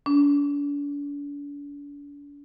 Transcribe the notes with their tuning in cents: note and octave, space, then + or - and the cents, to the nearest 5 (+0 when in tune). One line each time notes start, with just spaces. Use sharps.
D4 -40